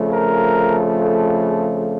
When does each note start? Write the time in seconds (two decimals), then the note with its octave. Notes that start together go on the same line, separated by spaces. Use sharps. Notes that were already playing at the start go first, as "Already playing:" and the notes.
Already playing: F2 C#3 F3 A3
0.13 A#4
1.02 A4
1.46 G#4